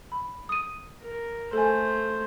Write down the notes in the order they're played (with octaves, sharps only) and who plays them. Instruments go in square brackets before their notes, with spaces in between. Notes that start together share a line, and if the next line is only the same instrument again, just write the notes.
[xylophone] B5
D#6 D#7
[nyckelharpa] A#4
[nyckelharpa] A3 C5 [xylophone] A4 G#5